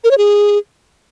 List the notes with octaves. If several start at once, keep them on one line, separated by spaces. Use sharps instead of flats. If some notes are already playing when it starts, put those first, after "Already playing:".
A#4
C#5
G#4